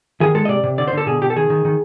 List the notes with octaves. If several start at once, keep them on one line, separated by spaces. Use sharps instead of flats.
D#3 G#4
G#3 A4
D#5
C3 D5
C3
D3 D5
C5
D3 A4
B2 G#4
B2 G4
A4
D#3 G#4
D#3
D#3